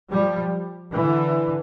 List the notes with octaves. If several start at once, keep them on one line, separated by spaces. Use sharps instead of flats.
F3 G3
D3 E3